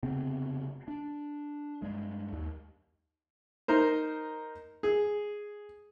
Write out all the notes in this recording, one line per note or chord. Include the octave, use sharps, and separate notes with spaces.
F1 C#3 B3 C4
D4
G2 G#3
D#2
D#4 A#4 C5
G#4